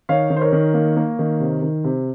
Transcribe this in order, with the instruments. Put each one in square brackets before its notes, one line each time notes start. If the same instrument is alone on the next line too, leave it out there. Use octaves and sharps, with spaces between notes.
[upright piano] D#3 C#5 F5
D#3
C5
A#4 C#5
D#3
A#3
A#3
D#3
C3
D#3
C3